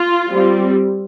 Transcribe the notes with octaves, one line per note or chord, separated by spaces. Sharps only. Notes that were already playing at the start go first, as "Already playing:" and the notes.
Already playing: F4
G3 C4